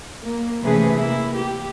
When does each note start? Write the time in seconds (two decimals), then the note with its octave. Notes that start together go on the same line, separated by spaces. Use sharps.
0.22 A#3
0.62 C3 E3 A3 C#4 G#4 B4
0.94 A#3 E4
1.34 G4